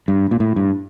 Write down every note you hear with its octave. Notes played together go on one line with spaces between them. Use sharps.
G2
A#2
A2
G2